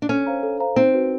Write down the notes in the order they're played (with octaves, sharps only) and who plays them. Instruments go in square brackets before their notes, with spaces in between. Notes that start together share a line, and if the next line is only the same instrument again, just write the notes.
[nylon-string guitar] D4
[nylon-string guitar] C#4 [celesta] A4
[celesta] C5 F5 A#5
A4
C5 F5 A#5
[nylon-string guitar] C4 [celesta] D#4
[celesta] F#4 B4